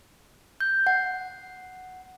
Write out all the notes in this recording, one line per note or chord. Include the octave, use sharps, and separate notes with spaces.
G6
F#5